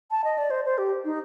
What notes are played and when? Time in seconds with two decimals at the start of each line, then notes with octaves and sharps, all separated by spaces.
0.11 A5
0.24 D#5
0.38 D5
0.50 C5
0.65 C5
0.78 G4
1.05 D#4